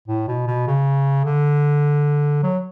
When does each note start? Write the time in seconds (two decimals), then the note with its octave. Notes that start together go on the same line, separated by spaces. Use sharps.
0.08 A2
0.28 B2
0.47 B2
0.67 C#3
1.25 D3
2.43 F#3